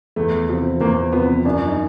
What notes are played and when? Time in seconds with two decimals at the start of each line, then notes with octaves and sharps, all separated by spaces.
0.16 E2 A3
0.49 C3 F3
0.81 E2 A#3
1.12 C3 F3 B3
1.45 F#2 D4
1.68 D#4